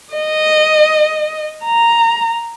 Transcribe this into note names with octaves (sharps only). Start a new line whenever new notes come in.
D#5
A#5